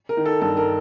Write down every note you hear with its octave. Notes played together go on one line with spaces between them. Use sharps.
A#4
D#3
A4
G2 A4
A#4